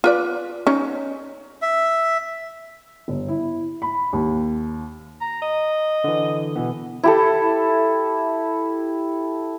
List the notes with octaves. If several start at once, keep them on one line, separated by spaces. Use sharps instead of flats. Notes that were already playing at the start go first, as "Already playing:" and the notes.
F4 B4 D5
C#4 D#4
E5
G1
E4
B5
D#2
A#5
D#5
D3 E3
B2 E3 B3
E4 G4 A4